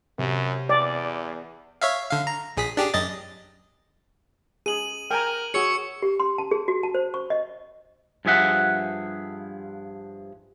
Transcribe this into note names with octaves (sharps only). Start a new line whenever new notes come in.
F#2 C3
E2 D5
C#5 E5 F5
D3 F5
A#5
A#1 G#4 B6
D4 G4 G#4
F#2 D#5 A6
G#4 D#7 F#7
A#4 G5 G#5 A#5
F#4 G#4 C#5 C#6 E6 C#7
G4
C6
A5
G#4
F#4
A5
C5
C#6
D#5
G2 F3 G#4 E5 F#5